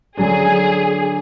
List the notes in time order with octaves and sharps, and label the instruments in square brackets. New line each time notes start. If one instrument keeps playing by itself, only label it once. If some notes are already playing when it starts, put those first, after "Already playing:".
[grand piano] D3 F#3 D4 [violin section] G#4